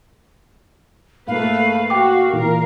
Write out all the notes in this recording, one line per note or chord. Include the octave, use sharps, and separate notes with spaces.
G#2 A3 A#3 B4 F5
F#4 G5 D6
A#2 E3 A#4